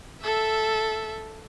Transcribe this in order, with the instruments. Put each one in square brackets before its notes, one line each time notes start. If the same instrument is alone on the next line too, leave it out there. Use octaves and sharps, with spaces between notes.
[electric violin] A4 E5